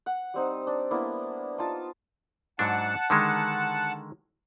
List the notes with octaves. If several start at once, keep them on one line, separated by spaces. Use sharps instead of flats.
F#5
G3 C4 D#4
D4
A#3 B3 D4 E4
D#4 F4 A5
G#2 F#3 D4 F#5 A5
D3 D#3 G#3